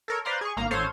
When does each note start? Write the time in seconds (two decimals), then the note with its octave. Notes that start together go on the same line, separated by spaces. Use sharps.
0.08 A4 A#4 C#5
0.25 B4 C5 D5 F5 A#5 C6
0.41 G#4 C#6
0.57 G#1 A#3 F5 A#5
0.71 A1 A4 C5 C#5 F5 D#7